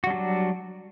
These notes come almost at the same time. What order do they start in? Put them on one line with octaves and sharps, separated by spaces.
F#4 G3 D4 F#3